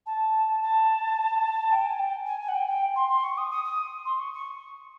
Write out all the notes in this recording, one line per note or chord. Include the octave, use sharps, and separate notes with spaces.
A5
A5
G5
G#5
G5
G#5
G#5
F#5
G5
G5
C6
C6
C#6
D#6
D#6
D#6
C6
C#6
C#6